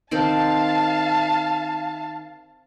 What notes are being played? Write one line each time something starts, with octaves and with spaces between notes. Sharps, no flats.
D#3 C4 C5 F5 A5